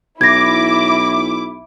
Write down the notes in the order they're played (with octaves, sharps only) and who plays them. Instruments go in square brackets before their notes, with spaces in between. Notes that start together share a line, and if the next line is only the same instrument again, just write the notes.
[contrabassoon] B1 [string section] E4 D6 [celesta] G#6 A#6